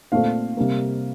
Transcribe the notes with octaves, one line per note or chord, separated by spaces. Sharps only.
A#2 A3 C4 F5
C3 G3 A#3